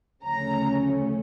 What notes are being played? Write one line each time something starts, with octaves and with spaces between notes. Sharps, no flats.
D2 C#3 F3 A3 C#4 A#5